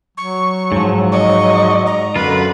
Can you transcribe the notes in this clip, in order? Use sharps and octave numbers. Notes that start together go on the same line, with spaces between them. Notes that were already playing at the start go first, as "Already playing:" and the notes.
F#3 C#6
G#2 F3
D#5 C#6
A#5
F#2 D3 F4 B4